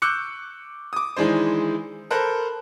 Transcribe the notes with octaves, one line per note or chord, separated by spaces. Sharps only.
C#6 D6 E6 F#6 G6 C#7
D6 D#6
D#3 E3 G#3 D4 C5
A4 A#4 C5 B5 F#6